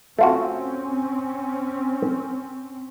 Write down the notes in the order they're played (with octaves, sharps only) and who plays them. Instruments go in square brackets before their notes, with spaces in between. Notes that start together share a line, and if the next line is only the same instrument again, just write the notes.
[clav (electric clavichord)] A3 F4 F#4 [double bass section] C4 C#4